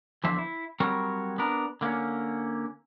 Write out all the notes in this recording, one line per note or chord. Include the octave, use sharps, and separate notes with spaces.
E2 D3 F3 C5 E5
E4
F#3 G3 C4 A#4 C#5
B3 D4 A#4
D3 A#3 C4 C#4